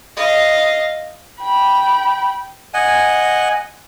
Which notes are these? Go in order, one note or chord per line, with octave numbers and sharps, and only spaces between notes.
D#5 F5
G5 B5
D#5 F#5 G#5